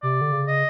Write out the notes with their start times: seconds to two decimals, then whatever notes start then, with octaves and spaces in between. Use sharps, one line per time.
0.03 C3 D5
0.21 D3
0.32 C#3
0.47 D#5